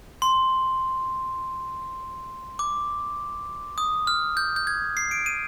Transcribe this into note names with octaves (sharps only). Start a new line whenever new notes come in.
C6
D6
D#6
F6
G6
G6
G#6
C7
D7
D#7